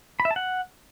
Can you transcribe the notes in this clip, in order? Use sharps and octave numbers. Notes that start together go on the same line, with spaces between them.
B5
E5
A5
F#5